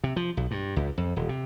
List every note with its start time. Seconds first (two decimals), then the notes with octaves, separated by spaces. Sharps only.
0.04 C3
0.16 F3
0.37 B1
0.51 G2
0.76 C#2
0.98 F2
1.16 D#1
1.29 C3